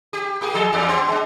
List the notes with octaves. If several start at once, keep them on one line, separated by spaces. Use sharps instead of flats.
G4
A#3 G4 G#4
F3 G#4 A4
E2 G2 D5
B3 C4
G#3 D4